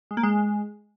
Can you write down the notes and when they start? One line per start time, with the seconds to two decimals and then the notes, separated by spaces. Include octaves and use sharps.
0.11 G#3
0.17 A#3
0.23 G#3